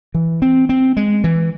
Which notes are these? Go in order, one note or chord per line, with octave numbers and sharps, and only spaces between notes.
E3
C4
C4
G#3
E3